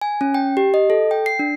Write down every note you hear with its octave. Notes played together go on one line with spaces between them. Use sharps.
G#5
C#4
G5
G4
D#5
A4
G5
C7
D4